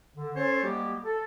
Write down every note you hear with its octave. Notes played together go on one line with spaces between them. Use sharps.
D3
C#4 A4 C5 C#5
G3 G#3 A#3 B3 F#4 G4
A4